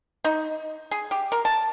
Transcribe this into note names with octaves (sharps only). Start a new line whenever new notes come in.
D#4
G#4
G4
A#4
A5